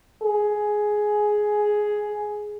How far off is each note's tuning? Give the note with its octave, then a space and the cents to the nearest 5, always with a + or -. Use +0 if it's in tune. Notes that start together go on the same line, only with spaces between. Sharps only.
G#4 +10